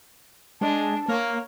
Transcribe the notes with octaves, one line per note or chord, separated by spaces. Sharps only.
G#3 D4 A5
A#3 A#4 C#5